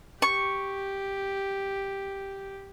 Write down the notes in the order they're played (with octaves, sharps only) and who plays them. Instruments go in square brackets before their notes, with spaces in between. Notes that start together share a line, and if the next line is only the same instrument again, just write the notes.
[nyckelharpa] G4 [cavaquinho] C#6